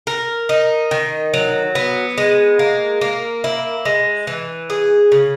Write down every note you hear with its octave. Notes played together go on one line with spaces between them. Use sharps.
A#4
D#4
D#3
F#3
B3
G#3
A#3
A#3
E4
G#3
E3
G#4
C#3